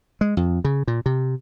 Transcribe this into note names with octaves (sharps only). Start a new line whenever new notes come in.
G#3
F2
C#3
A#2
C3